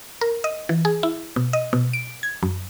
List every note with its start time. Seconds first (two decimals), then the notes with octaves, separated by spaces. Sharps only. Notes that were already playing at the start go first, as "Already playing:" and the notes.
0.21 A#4
0.44 D#5
0.69 E3
0.85 G#4
1.03 E4
1.36 B2
1.53 D#5
1.73 B2
1.93 D7
2.23 G#6
2.43 F#2